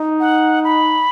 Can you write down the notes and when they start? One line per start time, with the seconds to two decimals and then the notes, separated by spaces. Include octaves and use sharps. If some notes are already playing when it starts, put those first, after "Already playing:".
Already playing: D#4
0.20 F#5
0.64 B5